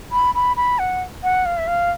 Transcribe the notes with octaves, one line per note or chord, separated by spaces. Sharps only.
B5
B5
B5
F#5
F#5
F5
E5
F5